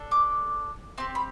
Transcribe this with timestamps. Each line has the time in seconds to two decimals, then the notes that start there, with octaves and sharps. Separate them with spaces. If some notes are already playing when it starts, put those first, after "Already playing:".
Already playing: D4 A4
0.11 D6
0.98 C4 G4 C6
1.15 B5